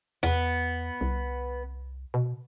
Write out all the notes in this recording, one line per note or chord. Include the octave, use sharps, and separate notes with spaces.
E2 B3
C2
B2